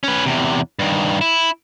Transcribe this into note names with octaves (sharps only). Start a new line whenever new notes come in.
C#4 B4
E2 C3
G2 D#3
E4